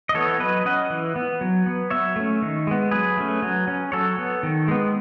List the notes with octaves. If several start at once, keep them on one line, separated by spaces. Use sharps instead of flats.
D#5
E3 B3 A4 C#5
F#3 B4 D#5
C#4 D#5 F#5
E3
B3
F#3
B3
F#3 C#5 E5
A3 C#4
D#3
G#3 B3
F#3 G#4 B4
A3 C#4
F#3
C#4
F#3 A4 C#5
B3
D#3
G#3 B3